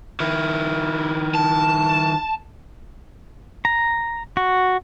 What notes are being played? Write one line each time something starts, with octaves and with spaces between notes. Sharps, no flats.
D#3 E4
A5
A#5
F#4